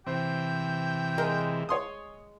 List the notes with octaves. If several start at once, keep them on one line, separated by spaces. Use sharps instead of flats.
C3 E3 C4 G5
G#3 A#4
C#5 C6 D#6